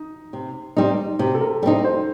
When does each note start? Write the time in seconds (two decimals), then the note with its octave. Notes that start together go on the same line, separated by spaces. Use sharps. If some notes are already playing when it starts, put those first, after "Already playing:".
Already playing: D#4
0.33 C3
0.77 G3 C4 D#4
1.19 C3 G4
1.35 A4
1.41 A#4
1.63 G3 C4 D#4 A4
1.85 C5